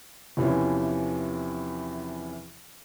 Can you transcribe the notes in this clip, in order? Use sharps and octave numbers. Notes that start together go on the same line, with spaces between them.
E2 C3 E3 F3 C#4